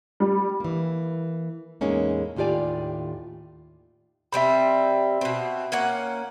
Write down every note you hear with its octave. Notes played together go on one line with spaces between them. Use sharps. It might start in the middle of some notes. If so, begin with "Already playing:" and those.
G3
E3 A#3
E2 A2 G#3 A#3 C#4 D#4
D#2 A2 F4 G4 D5 G#5
C3 G3 C4 E5 B5
B2 C4
A#3 C#4 F#5